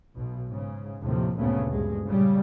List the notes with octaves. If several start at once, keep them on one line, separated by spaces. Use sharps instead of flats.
B1 B2
G#2 C#3
D#2 A2 C3 D#3 F3
D2 G2 A#2 C#3 A3 B3
D2 G2 G#3
A#2 C#3 G3